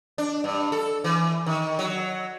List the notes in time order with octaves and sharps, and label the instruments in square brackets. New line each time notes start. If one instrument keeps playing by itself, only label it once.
[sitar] D4
G2
A4
E3
D#3
F#3